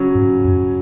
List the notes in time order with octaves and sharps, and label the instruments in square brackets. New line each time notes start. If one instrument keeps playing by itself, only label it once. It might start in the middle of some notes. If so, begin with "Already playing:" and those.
Already playing: [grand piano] C#3 F#3 C#4
[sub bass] G#2
F#2